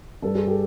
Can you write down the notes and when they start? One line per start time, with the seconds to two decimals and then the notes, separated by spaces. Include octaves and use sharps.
0.22 G2 A4
0.35 G#4
0.47 G4 A4